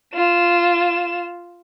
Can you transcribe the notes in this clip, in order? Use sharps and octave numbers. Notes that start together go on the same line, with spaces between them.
F4 E7